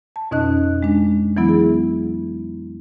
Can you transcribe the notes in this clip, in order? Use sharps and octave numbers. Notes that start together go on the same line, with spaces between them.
A5
F2 B2 C#4 D#4 D#5 F#6
G#3 D4
E3 F#3 B3 E4
G#4